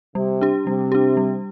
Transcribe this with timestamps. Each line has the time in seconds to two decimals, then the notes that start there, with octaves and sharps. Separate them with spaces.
0.15 C3 G3
0.41 D4 G4
0.66 C3 G3
0.92 D4 G4
1.17 G3